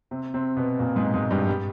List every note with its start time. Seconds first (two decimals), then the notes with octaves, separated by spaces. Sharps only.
0.11 C3 C4
0.34 C3 C4
0.57 B2 B3
0.79 A#2 A#3
0.96 G#2 G#3
1.14 G#2 G#3
1.31 G2 G3
1.47 G3